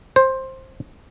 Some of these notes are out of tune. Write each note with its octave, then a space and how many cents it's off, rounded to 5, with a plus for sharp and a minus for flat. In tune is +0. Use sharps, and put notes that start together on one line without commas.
C5 +10